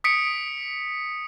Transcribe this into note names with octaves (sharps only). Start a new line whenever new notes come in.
D#6 B6 C#7 D7